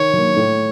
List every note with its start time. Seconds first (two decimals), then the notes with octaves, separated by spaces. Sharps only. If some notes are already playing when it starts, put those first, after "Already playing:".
Already playing: D#3 C#5
0.14 F#3 A#3
0.36 A2